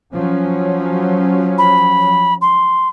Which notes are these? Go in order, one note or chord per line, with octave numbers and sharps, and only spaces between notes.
F3 F#3 C#4
B5
C6